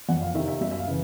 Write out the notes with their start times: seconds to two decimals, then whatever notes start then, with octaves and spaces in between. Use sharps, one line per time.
0.09 F2 F#5
0.22 F5
0.35 D#3 E5
0.39 C3
0.48 E5
0.61 F#2 E5
0.71 E5
0.78 F5
0.86 C#3 E3